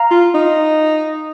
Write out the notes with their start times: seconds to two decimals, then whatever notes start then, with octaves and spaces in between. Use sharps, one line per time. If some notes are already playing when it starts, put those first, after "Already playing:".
Already playing: F5 A#5
0.11 F4
0.34 D#4